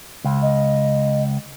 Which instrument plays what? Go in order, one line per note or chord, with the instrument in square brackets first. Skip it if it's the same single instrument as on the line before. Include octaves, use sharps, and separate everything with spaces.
[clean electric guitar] C#2
[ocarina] D#5